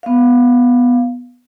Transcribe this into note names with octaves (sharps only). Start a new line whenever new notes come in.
B3 F5